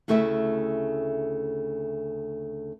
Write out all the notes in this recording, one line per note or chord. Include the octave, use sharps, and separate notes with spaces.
D2 C#3 A3 E4 C5 E5